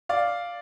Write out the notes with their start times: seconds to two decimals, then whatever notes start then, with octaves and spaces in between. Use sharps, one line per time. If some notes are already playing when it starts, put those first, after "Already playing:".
0.09 D5 F5